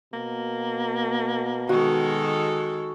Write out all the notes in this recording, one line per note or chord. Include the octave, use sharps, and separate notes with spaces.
B2 A#3
D#3 G#3 F#4 A4